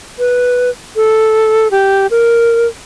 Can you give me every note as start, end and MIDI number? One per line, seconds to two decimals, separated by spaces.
0.19 0.70 71
0.96 1.68 69
1.71 2.07 67
2.11 2.67 70